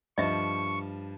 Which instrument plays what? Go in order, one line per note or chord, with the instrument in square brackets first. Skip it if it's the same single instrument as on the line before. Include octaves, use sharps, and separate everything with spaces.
[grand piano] G2 F3 [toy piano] D#5 E5 [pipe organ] C#6